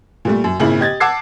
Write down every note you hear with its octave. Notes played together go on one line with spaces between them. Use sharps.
A#2 G3 A3
F#2
G#1 A#2 C#3 E4 F#7
G4 D#5 G#6 A6
F#5 A5 D6 E6 G#6 C7